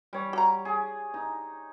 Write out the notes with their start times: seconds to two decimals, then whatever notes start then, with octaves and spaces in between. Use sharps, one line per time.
0.13 G3 C#5
0.33 F#4 A#5
0.65 G#4
1.14 D#4